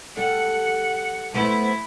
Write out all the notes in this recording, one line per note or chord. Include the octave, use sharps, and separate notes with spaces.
G3 A4 F#5
A3 B3 E4 C5